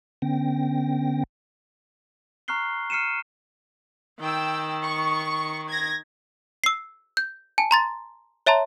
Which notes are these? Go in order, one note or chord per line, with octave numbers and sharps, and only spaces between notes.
D3 B3 C#4 G5 A#6
A#5 C#6 F6 F#6 C7 G7
F6 C7 C#7 D#7 E7
D#3 G5 E6
C#6
G#6 A#6
E6 C7
G6
G#5 A5
A#5 C6 A6
C#5 E5 A5 A#5 C6